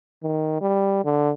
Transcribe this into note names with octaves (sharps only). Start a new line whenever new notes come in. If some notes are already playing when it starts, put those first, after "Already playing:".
D#3
G3
D3